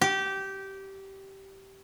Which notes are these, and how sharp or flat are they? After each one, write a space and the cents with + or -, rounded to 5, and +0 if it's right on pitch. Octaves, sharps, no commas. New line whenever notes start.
G4 -15